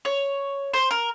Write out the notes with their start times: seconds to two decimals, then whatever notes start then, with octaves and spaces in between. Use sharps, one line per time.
0.05 C#5
0.74 C5
0.91 A#4